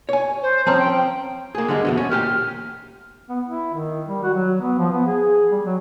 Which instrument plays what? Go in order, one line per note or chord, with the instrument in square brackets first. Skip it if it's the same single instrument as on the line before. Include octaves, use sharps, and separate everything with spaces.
[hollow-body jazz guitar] C#5 G#5
[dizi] C5
[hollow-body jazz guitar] F3 C4 C#4 [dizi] A#5
[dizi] G5
[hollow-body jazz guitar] A#3 G#4
D3 G3 G#3
E2 G#2 B2
C#4
[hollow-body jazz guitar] A#2 G4 G5 [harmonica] F6
[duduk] B3
E4
D#3
G3
F#4
F#3
B3
F3
B3
G#4
G3
F#3